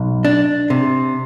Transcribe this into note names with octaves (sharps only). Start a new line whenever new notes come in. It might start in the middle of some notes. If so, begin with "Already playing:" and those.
Already playing: B1
D4
C3